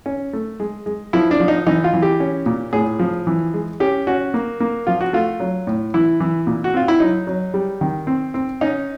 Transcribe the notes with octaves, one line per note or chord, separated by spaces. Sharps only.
C#4
A3
G#3
G#3
F3 E4
D4
F3
D#4
E3 D#4
F4
E3
G4
C#4
A#2
A2 G#4
F3
E3
G#3
C#4 G4
C#4 F#4
A#3
A#3
F3 F4
F#4
A3 F4
F#3
A2
E3 E4
E3
A#2
F#4
C4 F4
E4
F#3 D#4
F#3
G3
D#3
C4
C4
C#4 D#4